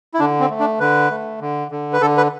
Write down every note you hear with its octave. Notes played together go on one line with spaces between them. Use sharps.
E4
D3 D4
C4
A3
D4
D3 B4
A3
D3
D3
B4
D3 A4
B4